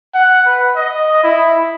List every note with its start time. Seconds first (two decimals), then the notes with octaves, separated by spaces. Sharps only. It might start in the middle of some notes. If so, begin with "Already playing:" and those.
0.14 F#5
0.46 B4
0.77 D#5
1.23 E4